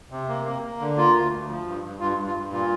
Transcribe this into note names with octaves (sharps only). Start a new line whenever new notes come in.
C3
A#3
A#3
A#3
D3
A#3 F4
D2
D2
F3
G2
G2
G2 F4
G2
F4
G2
A#2 F4